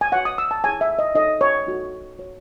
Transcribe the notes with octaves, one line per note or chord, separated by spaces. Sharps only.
G#5
F#4 C#5 F#5
D#6
E6
A5
E4 G#4 C#5 G#5
E5
D#5
D#4 A4 C#5 D#5
C#5
D#4 F#4 A4
F#4 C#5